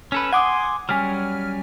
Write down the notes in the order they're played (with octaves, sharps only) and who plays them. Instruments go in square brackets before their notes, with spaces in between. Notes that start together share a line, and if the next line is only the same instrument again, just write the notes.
[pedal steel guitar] C#4 A4 B4
[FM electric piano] F#5 D6 D#6 [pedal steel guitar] G#5 C6
[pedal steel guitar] F#3 G3 C#4 [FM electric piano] G#5 F6